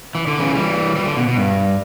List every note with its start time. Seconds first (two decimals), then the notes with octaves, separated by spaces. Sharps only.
0.15 E3
0.27 D3
0.38 C#3 E3
0.49 A3
0.55 E3 G3
0.96 E3 G3
1.06 D3
1.17 B2
1.27 B2
1.37 G2